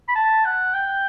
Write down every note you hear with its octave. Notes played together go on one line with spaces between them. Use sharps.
B5
A5
F#5
G5